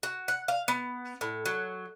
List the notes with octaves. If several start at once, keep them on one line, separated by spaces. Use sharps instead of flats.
F#4
F#5
F5
B3
A2
F#3